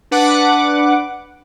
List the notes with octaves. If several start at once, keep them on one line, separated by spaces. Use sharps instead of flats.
D4 B4 F#5 D6